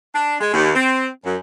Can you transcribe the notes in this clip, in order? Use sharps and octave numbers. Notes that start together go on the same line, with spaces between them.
D4
G#3
D#2
C4
F#2